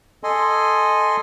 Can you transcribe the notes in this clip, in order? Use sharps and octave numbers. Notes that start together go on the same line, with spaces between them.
A4 D#5 G#5 C6